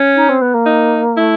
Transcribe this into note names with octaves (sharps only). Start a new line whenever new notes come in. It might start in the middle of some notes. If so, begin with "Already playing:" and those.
Already playing: C#4
D#4
C4
B3
A#3
D#4
A3 E4